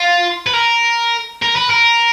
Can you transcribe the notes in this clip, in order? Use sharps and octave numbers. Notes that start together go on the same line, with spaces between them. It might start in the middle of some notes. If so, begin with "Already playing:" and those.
Already playing: F4
B4
A#4
A#4
B4
A#4